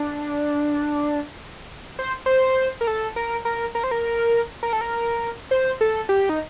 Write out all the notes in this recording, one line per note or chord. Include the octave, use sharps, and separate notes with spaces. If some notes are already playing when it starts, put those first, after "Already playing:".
Already playing: D4
C5
C5
A#4
A4
A#4
A#4
A#4
C5
A#4
A#4
A4
A#4
C5
A4
G4
D#4